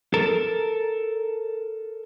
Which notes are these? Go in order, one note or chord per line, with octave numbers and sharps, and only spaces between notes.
A4 A#4